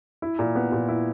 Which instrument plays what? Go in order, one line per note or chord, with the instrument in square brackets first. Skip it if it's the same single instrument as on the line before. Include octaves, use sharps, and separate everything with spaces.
[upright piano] E4
A#2
B3
A#2
E4